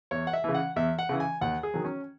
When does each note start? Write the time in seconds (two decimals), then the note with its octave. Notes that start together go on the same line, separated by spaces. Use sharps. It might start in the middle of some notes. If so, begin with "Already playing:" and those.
0.11 E2 C#5
0.27 F#5
0.33 E5
0.44 C#3 E3
0.55 F#5
0.76 E2 E5
0.99 F#5
1.09 C#3 E3
1.20 G#5
1.41 D#2 F#5
1.63 G#4
1.74 D#3 F#3
1.85 C#4